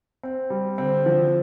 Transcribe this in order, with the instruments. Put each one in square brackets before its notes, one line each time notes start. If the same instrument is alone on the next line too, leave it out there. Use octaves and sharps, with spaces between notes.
[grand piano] C4
G3
[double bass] D3 [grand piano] C4
[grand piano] F3